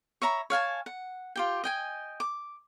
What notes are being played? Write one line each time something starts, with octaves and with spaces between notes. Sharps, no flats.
C#5 E5 A#5 B5
C#5 F5 G#5 A5
F#5
F4 G4 G5
D#5 G5 G#5
D6